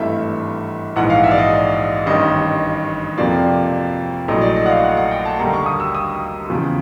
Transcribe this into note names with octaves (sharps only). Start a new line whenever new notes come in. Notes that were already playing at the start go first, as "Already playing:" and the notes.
Already playing: G#1 G2 E3 A3 E5
A#1 G#2 E3 F#5
F5
E5
D5
D#5
A1 G2 D#3 D#5
F2 C3 F3 A#3 D5
A#1 A2 F#3 A3 D#5
D5
D#5
F#5
F5
F#5
F#5
G5
A5
D#2 D3 G3 A#3 A#5
C#6
D#6
E6
D#6
E2 C#3 F3